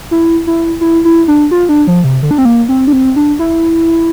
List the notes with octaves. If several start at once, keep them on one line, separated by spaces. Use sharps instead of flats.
E4
E4
E4
E4
D4
F4
D4
F3
C3
D3
D4
C4
A#3
C4
D4
C4
D4
E4